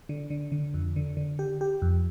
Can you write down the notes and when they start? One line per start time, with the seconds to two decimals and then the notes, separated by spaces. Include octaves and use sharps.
0.09 D3
0.30 D3
0.52 D3
0.74 F2
0.96 D3
1.17 D3
1.39 G4
1.61 G4
1.82 F2